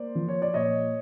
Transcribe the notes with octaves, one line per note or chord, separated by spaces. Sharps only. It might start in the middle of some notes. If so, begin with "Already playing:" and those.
Already playing: A#3 C5 D5
F3
C#5
D5
A#2 C#5 D#5